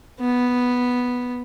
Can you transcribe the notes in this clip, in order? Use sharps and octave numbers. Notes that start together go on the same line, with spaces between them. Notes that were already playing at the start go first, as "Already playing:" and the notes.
B3